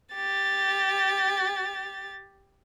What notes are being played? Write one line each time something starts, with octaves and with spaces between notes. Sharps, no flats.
G4 A6